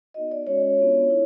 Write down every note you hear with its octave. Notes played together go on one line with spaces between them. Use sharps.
B3 D#4 F#4 D#5
D5
G#3 C#4 F#4 C#5
B3 D4 F4
E4